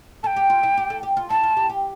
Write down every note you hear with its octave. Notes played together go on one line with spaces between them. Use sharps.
A4 G5 A5
G4
F4
E4
G4
A4
G4
F4
E4 A5
F4
G4
G4